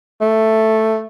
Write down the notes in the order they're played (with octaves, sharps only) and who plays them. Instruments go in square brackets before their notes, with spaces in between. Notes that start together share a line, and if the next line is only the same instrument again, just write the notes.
[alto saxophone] A3